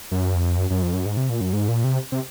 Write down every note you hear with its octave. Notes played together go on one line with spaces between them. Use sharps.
F#2
F2
F#2
F#2
F2
F#2
G#2
C3
A#2
F#2
G#2
A#2
C3
C3